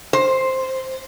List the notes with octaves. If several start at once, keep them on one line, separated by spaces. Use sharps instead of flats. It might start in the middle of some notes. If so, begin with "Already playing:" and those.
C5